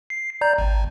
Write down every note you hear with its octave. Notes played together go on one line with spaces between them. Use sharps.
C7
D5 A#5 G6
G#1